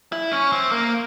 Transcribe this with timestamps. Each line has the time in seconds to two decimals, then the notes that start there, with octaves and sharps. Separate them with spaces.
0.12 E4
0.33 C#4
0.52 C4
0.72 A#3